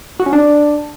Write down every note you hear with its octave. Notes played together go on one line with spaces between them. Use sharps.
F#4
C#4
D4